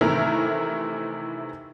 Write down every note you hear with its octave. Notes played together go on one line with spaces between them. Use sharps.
C3 D#3 E3 A3 E4 A#4